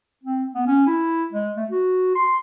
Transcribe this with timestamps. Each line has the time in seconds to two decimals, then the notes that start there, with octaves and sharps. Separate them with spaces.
0.24 C4
0.55 B3
0.67 C#4
0.87 E4
1.33 G#3
1.57 A3
1.70 F#4
2.15 C6